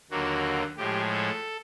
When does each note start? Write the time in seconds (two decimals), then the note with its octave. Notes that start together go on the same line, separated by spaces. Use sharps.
0.11 D#2 D3 F#3 A#3 F#4
0.77 A2 F3 G#3 G4
1.11 A4